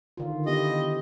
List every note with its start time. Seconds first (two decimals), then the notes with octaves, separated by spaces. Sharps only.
0.17 D3 D#3 F4
0.46 B3 E4 G4 D#5